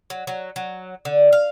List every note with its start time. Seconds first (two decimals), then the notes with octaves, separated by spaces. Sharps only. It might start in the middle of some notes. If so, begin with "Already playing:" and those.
0.10 F#3
0.27 F#3
0.56 F#3
1.05 D3
1.33 F5